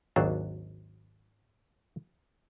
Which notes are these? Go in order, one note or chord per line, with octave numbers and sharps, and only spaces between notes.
G#1 D#2 F#3 D4 C5